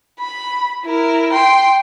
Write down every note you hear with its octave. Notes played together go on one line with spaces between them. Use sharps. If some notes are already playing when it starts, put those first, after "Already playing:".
B5
E4 A#4
G5 C6